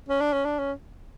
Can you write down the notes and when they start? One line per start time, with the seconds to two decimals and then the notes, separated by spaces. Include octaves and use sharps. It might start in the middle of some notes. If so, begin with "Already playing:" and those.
0.09 C#4
0.21 D4
0.33 C#4
0.45 D4
0.59 C#4